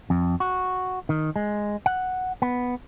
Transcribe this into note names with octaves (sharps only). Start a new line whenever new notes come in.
F2
F#4
D#3
G#3
F#5
B3